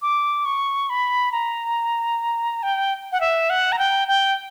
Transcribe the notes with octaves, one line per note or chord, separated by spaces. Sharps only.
D6
C#6
B5
A#5
G5
F#5
E5
F#5
A#5
G5
G5